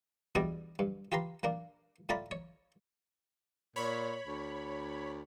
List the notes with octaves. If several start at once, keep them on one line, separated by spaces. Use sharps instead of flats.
E2 B2 G3 D4 F#4 D6
G2
F4 G4 B4 A#5 C6
A#2 A#3 D4
A2 F4 D5 A#5 B5
C#5
A#2 C#5 B5
D2